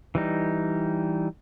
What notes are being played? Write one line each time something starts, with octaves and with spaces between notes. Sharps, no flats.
E3 G3 D#4